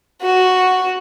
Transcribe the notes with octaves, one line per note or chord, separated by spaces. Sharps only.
F#4